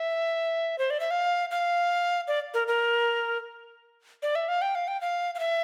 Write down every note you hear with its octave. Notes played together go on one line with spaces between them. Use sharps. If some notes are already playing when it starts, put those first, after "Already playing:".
Already playing: E5
C5
D5
E5
F5
F5
D5
A#4
A#4
D5
E5
F5
G5
F5
G5
F5
F5
E5